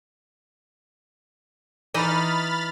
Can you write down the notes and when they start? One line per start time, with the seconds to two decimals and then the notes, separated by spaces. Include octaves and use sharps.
1.94 E3 D#4 D#5 B5 F6 A6